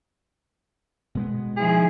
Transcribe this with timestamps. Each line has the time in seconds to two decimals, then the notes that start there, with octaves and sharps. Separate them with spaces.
1.15 B2 G#3 B3
1.57 D#3 F3 E4 G#4